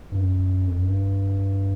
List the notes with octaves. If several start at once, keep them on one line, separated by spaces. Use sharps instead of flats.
G2
F#2
F2
F#2
G2